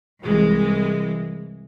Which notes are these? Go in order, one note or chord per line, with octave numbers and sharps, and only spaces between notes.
C2 E3 G#3